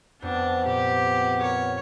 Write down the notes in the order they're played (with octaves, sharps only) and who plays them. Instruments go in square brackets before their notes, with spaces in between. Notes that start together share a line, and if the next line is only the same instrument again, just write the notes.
[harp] F2 [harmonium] B3 [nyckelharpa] D4
[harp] A#2 [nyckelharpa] G4
[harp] A#4 [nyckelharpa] C#5